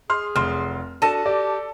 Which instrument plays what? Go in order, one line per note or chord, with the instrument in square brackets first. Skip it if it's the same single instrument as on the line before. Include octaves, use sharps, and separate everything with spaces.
[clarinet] G#4 [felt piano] C6 F6
[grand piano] F1 [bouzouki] F#3 [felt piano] C6 F6
[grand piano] D4 [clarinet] F#4 [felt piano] A4 A#6 D#7 [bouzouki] A5
[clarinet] G4 [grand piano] D5